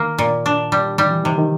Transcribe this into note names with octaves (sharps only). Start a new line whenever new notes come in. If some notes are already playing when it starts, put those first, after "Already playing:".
Already playing: D#3 A#3
A#2
D4
G3
D#3 G3
E3
C3 D#3
D#3